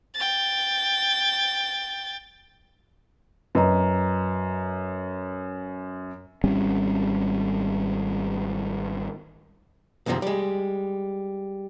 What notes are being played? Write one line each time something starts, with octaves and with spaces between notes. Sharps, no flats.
G5 A6
F#2 B4 D#5 A#5
G#1 G3 C4 C#4
C#2 F#2 C3 D#3 F3 C4
G3 G#3